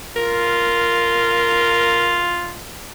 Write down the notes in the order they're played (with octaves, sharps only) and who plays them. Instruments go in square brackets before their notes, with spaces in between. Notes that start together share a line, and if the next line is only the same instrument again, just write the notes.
[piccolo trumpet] F4 [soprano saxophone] A#4